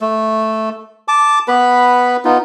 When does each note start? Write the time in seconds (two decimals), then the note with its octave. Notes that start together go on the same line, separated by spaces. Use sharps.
0.01 A3
1.08 A5 D6
1.48 B3 B4 B5
2.25 B3 D#4 F4